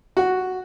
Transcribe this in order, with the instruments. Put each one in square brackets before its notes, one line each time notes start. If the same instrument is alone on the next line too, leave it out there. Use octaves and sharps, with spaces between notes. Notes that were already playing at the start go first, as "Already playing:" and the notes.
[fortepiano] F#4